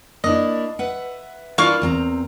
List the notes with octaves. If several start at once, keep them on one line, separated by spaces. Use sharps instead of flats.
A#3 D4 E4 D#5
B4 E5 F#5
A#3 D4 E4 F4 F5 C#6
E2 C4 A#5